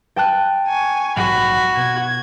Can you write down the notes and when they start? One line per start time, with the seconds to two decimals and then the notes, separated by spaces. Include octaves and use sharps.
0.16 G5 A5 F#6
0.68 G#5 C#6
1.17 A#1 G#2 F#3 F#4 B5
1.77 B2 G#6